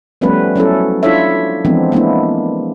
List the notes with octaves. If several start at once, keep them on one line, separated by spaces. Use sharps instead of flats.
F3 G3 A3 B3 C#4 B4
F#3 C#4 E4 A4
D4 E4 F4 A4 C#5 E5
E3 F3 G#3 B3 C4 D4
G#3 A#3 B3 D4 E4